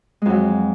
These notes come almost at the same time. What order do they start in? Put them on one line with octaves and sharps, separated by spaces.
G#3 F2 F#3